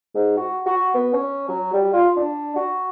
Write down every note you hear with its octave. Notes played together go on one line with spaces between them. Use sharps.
G#2
F#4
F#4
B3
C#4
F#3
G3
F4
D4
F#4